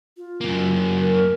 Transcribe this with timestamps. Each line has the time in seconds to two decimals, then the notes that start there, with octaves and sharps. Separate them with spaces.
0.17 F4
0.41 F#2 A#3
1.01 A#4